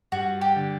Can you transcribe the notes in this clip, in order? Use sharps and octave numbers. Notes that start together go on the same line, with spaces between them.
G2 F#4
G4
D3